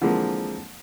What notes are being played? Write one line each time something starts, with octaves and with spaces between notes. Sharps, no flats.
D3 E3 F3 G#3 A#3 C4